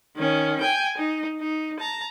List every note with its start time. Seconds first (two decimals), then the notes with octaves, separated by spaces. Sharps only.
0.17 D#3 C#4
0.61 G5 G#5
0.97 D#4
1.40 D#4
1.79 A5 A#5